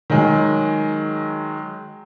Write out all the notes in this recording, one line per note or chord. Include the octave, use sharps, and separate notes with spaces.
D#3 F#3 G#3